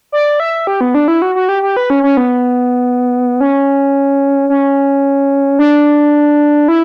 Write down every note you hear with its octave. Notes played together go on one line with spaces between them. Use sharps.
D5
E5
G4
B3
D4
E4
F#4
F#4
G4
G4
B4
C#4
C#4
B3
C#4
C#4
D4
E4